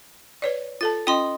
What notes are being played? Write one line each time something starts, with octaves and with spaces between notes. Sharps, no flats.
B4 C#5 D5
F4 A4 A5 A6
C#4 F4 D#5 G5 C6 D#6